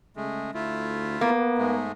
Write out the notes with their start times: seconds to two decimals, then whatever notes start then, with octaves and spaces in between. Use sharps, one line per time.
0.16 C#3 G#3 A3
0.54 D2 A3 E4 F4
1.21 A#3 B3
1.58 G#2 G#3 A3